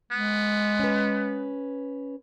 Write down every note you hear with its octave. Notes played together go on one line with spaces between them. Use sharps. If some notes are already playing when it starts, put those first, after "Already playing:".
G#3 B3
C#4 B4